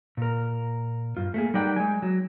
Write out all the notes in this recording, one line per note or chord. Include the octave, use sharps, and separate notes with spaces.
A#2 A#4
G2 F4
A3 A#3 G#4
G3 D#4 A#4 D5 F#5 G5
G#3 G#5
F#3